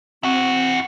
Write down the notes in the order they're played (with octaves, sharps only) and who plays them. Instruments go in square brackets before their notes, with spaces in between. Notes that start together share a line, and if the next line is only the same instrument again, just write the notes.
[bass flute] C4 [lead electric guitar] E4 F#4